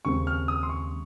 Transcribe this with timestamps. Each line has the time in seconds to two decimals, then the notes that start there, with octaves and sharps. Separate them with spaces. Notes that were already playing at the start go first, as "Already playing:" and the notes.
0.05 D#2 C#3 G#3 C4 C#6
0.27 F6
0.48 D#6
0.63 C6
0.69 C#6